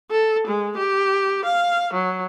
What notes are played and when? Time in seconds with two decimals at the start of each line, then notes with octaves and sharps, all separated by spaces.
0.11 A4
0.47 G#3
0.77 G4
1.45 F5
1.94 F#3